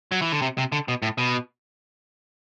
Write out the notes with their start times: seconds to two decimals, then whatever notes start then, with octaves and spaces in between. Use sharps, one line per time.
0.12 F#3
0.22 E3
0.32 D3
0.42 C3
0.58 C3
0.72 D3
0.88 B2
1.02 A2
1.18 B2